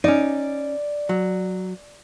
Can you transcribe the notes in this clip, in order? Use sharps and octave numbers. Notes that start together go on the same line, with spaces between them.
C#4 D#4 D5
F#3